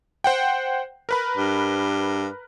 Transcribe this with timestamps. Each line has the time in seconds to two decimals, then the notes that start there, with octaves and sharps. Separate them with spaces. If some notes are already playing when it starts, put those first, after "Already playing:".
0.24 C5 F#5 G5
1.09 A#4 B4 B5
1.37 G2